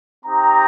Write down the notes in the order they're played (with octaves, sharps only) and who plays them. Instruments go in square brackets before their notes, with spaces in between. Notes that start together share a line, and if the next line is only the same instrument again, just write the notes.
[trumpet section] C4 D#4 G4 A#5